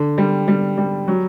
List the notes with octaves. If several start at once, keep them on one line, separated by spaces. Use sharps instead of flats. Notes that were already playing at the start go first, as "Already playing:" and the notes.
Already playing: D3
G3
G3
G3
F#3